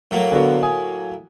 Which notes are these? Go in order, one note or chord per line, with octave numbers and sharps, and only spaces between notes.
A2 F#3 A#3
D3 B3 F#4
G#5 D#6